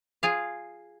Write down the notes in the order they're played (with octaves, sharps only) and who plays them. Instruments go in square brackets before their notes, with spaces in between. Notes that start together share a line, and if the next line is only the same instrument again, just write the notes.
[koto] F4 G#4 F5